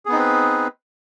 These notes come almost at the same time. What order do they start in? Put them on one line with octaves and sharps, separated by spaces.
G#4 B3 D#4 C4 B4